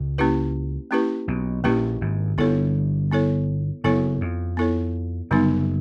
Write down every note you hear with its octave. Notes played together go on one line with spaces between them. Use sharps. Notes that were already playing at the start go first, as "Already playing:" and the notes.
Already playing: C#2 C#3
A#3 C#4 E4 G4 B4
A#3 C#4 E4 G4 B4
B1 B2
A#1 A#2 A#3 C#4 E4 G4 B4
G#1 G#2
G1 G2 B3 E4 A4 C#5
B3 E4 A4 C#5
F#1 F#2 B3 E4 A4 C#5
F2
B3 E4 A4 C#5
F#1 F#2 D3 G3 B3 D#4